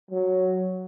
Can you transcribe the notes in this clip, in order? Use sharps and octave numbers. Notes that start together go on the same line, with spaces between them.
F#3